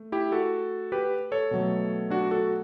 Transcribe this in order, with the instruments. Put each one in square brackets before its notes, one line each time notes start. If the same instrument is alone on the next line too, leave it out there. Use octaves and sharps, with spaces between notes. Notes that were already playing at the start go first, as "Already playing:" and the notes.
Already playing: [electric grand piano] A3
E4 G4
F#4 A4
G4 B4
A4 C#5
B2 F#3 A3
D4 F#4
F#4 A4